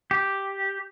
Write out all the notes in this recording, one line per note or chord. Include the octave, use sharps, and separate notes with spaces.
G4